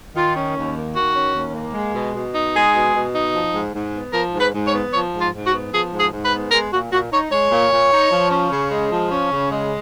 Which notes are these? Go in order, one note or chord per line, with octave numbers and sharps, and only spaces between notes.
D#3 F4
C#4
D#2
A#3
D#3 F#4
C#4
D#2
A#3
G#3
B2
B2
D#4
G#3 G#4
B2
B2
D#4
F3
G#2
G#2
B3
F3 A#4
G#2
B4
G#2
C#5
B3
F3 C#5
G#2
F4
G#2
F#4
B3
F3 G#4
G#2
G#4
G#2
B4
B3
G#3 A#4
A#2 F#4
A#2 F#4
D#4 C#5
G#3 C#5
A#2
A#2
D#4
F3
C#4
C#3
G#3
F3
C#4
C#3
G#3